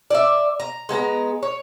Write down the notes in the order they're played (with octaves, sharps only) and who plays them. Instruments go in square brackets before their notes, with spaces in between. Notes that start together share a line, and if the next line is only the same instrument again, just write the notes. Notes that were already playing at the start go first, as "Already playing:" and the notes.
[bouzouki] D5 E5
A#5
G#3 B3 A5 A#5
C#5